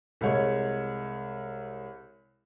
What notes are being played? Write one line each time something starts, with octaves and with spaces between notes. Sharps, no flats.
C2 G#3 C#5